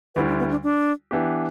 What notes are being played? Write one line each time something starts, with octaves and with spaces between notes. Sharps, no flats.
D2 D3 G3 E4 B4
D4
B3
D4
D4
E3 B3 D4 G4